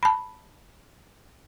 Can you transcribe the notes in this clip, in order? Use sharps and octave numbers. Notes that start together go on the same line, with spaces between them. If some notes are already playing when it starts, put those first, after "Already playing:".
A5 B5